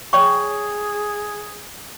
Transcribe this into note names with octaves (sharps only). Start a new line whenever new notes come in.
G#4 C#5 G5 C#6